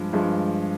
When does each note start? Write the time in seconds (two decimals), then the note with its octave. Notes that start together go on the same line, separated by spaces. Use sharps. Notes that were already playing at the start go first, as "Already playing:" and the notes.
Already playing: G2 F3 G#3
0.13 G2 F3 G#3